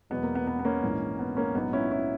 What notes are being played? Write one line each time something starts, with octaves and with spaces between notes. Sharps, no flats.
E1 E2 B2 F#3 B3
A#3
B3
B3
B3
A#3 C#4
A#1 G#2 E3
B3
A#3 C#4
A#1 G#2 F#3 B3 D#4
C#4 E4
C#4 E4